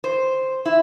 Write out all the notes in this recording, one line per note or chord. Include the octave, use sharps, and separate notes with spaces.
C5
E4